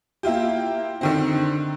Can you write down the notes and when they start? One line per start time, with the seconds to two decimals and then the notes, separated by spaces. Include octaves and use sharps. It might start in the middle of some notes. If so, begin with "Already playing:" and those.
0.23 A#3 E4 F4 G4
1.01 D3 D#3 C4